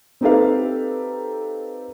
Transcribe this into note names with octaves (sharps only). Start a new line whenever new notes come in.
C4 D#4 G4 A4 B4 F5